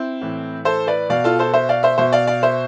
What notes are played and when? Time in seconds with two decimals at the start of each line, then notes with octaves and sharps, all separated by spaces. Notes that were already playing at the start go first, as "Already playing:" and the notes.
Already playing: C4 E4
0.21 A2 E3
0.65 A4 C5
0.87 B4 D5
1.10 B2 D5 F5
1.24 F4 A4
1.39 A4 C5
1.53 C5 E5
1.69 D5 F5
1.83 C5 E5
1.98 B2 C5 E5
2.12 D5 F5
2.27 D5 F5
2.43 C5 E5